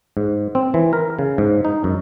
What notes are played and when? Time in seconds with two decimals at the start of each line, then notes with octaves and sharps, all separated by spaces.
0.17 G#2
0.55 C4
0.74 E3
0.93 A#4
1.19 C#3
1.38 G#2
1.65 D#4
1.84 F#2